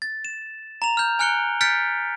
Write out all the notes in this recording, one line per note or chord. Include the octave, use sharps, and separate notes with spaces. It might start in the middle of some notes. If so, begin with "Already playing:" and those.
A6
E7
A#5 F7
F6 G6
G#5 F6 F#6 C#7 D7 G7
F6 G6 A6 B6 C#7 D7